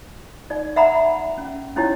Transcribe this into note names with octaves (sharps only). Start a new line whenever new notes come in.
D#4 D5
E5 F#5 A#5 B5
C#4
C#4 D#4 E4 G4 C#5